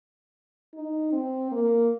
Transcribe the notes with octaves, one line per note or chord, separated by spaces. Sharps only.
D#4
C4
A#3